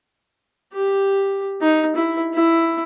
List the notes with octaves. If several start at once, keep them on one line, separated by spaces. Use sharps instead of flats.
G4
D#4
E4
E4